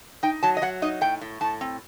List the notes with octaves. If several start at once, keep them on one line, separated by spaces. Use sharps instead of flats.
D#4 G5
F#3 A5
D#5
F#3 F#5
D#4 D#5
A2 G5
A2
A2 A5
C4